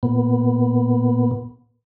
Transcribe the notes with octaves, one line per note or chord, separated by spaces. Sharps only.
A#2 B3